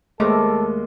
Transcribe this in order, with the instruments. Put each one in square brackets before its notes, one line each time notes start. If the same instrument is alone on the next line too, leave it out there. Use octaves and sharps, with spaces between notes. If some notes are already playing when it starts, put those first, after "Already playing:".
[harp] D#2 A#4 D6 [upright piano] G#3 [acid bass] A3 [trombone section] A4